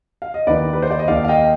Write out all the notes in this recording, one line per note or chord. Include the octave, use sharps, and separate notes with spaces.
F5
D#5
D#2 D#3 B4 D5
B4
C5
D5
D#5
D#2 D#3 D5 F5
F5
D#5 G5